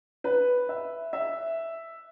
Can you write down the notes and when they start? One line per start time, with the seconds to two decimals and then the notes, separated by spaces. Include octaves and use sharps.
0.24 B4
0.69 E5
1.13 E5